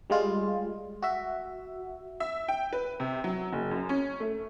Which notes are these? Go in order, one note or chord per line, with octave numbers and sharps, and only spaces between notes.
G3 G#3 F4
F#4 E5
E5
G5
B4
C3
F#3
F#1
F#2
C#4
A3